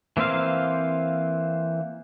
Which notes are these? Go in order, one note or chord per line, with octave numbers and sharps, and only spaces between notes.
E3 A#3 C4 C5 F5